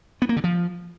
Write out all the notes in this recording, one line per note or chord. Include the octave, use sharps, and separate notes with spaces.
B3
A#3
D3
F3